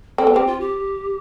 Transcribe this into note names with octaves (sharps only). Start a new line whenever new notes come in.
C4 A4
B3
C4 G4
F4
G4